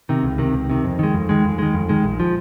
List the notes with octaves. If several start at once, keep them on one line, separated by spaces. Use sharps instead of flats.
C3 D#3
C#2
C3 D#3
C#2
C3 D#3
F2
D#3 G#3
F2
D#3 G#3
F2
D#3 G#3
F2
D#3 G#3
A#1
F3